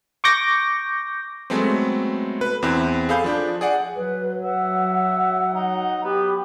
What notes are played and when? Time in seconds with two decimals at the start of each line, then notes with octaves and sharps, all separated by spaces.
0.24 C#6 D6 G6 A#6
1.50 F#3 G#3 A3 B3 C4
2.41 B4
2.63 E2 C4 E4 F#6
3.09 G#4 A4 F5 B5 G6
3.24 F3 D4
3.61 G#4 D5 F#5
3.96 F#3 B4
4.44 E5 F#5
5.54 D#4
6.04 B3 G4